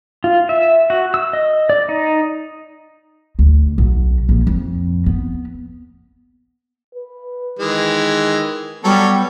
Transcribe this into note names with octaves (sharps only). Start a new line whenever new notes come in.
F4
E5
F#4
E6
D#5
D5
D#4
D2
B1
A#1
F2
B3
B4
D#3 E3 G#3
F#3 G3 B3 A4 C#5